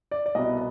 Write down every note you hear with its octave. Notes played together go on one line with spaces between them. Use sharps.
D5
D5
C2 B2 B3 D#5